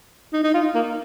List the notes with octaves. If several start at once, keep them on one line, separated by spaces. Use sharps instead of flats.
D#4
D#4
F4
A#3